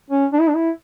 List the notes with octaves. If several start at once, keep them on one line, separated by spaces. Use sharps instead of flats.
C#4
D4
E4
D4
E4